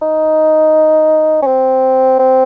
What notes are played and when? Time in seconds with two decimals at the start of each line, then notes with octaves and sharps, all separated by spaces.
0.02 D#4
1.42 C#4
1.46 C4
2.19 C4